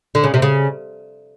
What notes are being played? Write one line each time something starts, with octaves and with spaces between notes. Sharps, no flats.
D3
C#3
C3
C#3